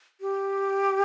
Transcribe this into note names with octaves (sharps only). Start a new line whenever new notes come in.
G4